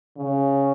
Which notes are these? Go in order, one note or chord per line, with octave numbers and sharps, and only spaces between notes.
C#3